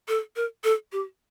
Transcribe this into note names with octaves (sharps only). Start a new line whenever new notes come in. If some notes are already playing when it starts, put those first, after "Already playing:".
A4
A#4
A4
G4